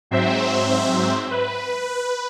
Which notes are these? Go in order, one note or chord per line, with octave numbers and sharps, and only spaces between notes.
G#2 F#3 C4 C5 E5
B4